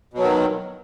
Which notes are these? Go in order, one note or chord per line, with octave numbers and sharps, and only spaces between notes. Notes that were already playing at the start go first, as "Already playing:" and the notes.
B2 D#3 F#3